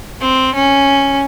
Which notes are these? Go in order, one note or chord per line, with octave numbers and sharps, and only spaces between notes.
C4
C#4